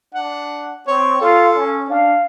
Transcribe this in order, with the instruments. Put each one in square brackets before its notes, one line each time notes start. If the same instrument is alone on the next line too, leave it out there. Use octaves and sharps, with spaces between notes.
[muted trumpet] D4 [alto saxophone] F#5
[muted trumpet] C4 [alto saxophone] C#5
[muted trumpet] F4 [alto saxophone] A4
[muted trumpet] C#4
[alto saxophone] D4 [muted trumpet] F5